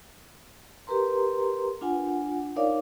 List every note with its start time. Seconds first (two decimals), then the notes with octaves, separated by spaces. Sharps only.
0.87 G4 A#4 B4 A#5 C6
1.81 D4 F4 F#5 G#5
2.56 D#4 A#4 C#5 D5 F5 D6